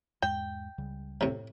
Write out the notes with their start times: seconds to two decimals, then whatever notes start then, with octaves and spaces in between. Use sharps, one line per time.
0.22 E2 G#2 G#3 G5
0.78 C#2 C#3 G3
1.21 A2 C3